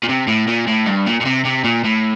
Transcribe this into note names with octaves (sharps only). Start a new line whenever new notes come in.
A#2
C3
A2
A#2
A2
G2
A#2
A#2
C3
C3
A#2
A2